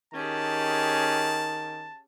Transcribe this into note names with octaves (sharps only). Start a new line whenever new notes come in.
D#3 C#4 G4 G#4 A5